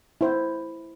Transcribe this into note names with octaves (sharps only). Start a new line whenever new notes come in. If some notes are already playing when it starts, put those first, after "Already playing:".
E4 C5